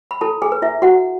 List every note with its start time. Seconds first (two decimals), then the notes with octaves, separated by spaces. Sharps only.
0.11 B5
0.21 E4 A4 A5
0.42 G#4 G#5
0.52 B4
0.62 E4 E5
0.82 E4 F#4 F#5